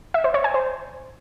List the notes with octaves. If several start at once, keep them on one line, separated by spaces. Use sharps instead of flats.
E5
C5
C#5
G#5
C5